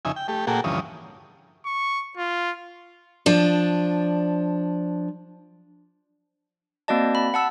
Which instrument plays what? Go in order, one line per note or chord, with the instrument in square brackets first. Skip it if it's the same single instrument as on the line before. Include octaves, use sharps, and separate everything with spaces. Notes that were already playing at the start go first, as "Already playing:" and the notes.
[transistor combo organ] F2 C#3 D#4 E5 G#5
G5
A3 G4
A#2 A#3 F#4 G#4 A4 G5
D2 G2 E3 F3 C#4 D#6
[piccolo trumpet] C#6
F4
[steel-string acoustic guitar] F3 D4
[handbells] A#3 C4 F#4 D5 D#5 A5
B5
F#5 A5 E6